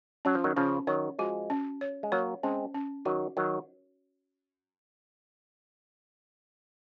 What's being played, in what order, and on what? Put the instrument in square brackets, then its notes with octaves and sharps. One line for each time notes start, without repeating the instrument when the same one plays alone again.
[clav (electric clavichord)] F#3 [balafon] C#4
[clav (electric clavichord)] F3
D#3 F#3
[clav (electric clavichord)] C#3 F3 [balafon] C#4
[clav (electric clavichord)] D#3 F#3 [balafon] C#5
[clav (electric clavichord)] F3 G#3 [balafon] F#4
[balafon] C#4
C#5
[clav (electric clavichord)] G#3
[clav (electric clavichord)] F#3 A#3 [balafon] C#5
[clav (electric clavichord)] G#3 C4 [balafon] C#4
[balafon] C#4
[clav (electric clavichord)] D#3 F#3 [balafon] F#4
[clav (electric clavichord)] D#3 F#3 [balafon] C#5